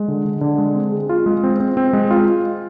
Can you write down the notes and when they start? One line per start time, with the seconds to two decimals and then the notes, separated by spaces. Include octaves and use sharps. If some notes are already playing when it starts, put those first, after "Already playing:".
Already playing: G#3
0.08 D3
0.25 D3
0.41 D3
0.58 G#3
0.75 C4
0.92 G#4
1.09 F4
1.26 G#3
1.44 C4
1.60 C4
1.77 C4
1.93 G#3
2.11 F4